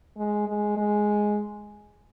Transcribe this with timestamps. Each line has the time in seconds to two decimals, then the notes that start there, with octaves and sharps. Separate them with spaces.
0.17 G#3
0.48 G#3
0.77 G#3